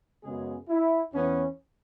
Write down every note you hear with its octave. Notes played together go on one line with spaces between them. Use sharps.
F#2 C#3 G#3 B3 G#4
E4
E2 E3 B3 C#4